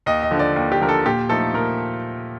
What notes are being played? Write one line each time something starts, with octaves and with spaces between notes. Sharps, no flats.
D#2 D#5
D#5
D3 F3
D5
D#2
G4
D3 F3 A#4
A4
A#2 G4
F3 A3 D#4 A4
A#2 A#4